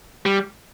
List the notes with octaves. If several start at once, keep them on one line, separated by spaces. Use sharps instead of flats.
G3